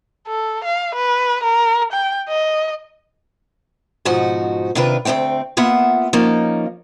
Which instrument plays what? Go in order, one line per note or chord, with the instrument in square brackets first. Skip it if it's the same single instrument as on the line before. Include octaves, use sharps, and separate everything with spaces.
[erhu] A4
F5
B4
A#4
G5
D#5
[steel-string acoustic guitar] G#2 B2 F3 D#4 F#4
C3 D#3 D4 F4 B4
D2 G#3 A3 C4 G5
A#3 B3 F4 E5 F#5
F3 A#3 C#4 D#4